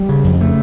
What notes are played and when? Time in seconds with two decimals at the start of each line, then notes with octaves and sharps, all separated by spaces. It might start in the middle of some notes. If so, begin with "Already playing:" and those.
Already playing: G3
0.09 C#3
0.24 F2
0.40 C#3 A3